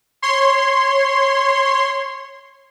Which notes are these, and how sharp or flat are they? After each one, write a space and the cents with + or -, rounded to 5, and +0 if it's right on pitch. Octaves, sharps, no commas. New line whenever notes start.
C#5 -20 C6 -5